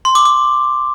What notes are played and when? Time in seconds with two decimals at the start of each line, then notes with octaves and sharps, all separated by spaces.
0.05 C6
0.15 D6
0.25 D6